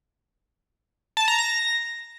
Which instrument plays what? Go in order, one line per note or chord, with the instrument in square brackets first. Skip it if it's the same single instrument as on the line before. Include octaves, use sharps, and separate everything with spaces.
[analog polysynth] A5
A#5
A#6